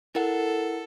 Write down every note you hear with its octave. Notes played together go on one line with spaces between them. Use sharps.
E4 A4 A#4 F#5